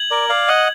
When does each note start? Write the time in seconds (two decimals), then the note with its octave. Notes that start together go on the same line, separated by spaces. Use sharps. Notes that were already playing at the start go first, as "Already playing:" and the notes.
Already playing: G#6 F#7
0.11 A#4 D5
0.29 D5 F5
0.48 D#5 F#5